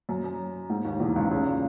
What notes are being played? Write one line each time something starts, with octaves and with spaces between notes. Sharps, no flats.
F#2
F#2
G#2
D#2 D#3
E2 E3
C#2 C#3
C#2 C#3
A#2